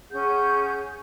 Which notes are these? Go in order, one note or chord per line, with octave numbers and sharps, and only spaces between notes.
C#4 G#4 F#5 G6